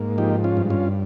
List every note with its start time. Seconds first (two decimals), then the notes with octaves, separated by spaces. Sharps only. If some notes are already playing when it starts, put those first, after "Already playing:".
Already playing: G#2 A#3
0.18 F3 D#4 G4
0.44 C#4 F4
0.57 G2
0.70 C#4 F4